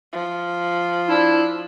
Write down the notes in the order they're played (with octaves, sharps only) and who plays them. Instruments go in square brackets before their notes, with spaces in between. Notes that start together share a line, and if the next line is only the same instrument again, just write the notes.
[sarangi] F3
[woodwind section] D4 E4